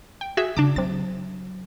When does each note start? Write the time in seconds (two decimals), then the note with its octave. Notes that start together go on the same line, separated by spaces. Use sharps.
0.21 G5
0.37 F#4 G#4 E5
0.57 C#3 D4 A5 D6
0.76 C3 F#3 A6